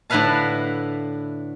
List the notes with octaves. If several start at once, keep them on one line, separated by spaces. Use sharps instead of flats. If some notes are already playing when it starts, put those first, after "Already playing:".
A2 D3 E4 B4 F5 A5